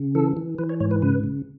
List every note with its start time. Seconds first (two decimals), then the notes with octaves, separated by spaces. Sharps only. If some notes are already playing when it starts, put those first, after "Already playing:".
Already playing: C#3
0.15 E3 A4
0.37 E3
0.58 E3 B4
0.69 C#5
0.80 G#2 C#5
0.91 B4
1.02 C#3 B4
1.24 C#3